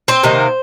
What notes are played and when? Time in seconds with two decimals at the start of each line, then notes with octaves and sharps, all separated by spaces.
0.08 C4 C5
0.23 C3 D#3 A#3